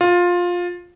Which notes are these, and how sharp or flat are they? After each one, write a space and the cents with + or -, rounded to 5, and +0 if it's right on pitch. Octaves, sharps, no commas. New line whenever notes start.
F4 +15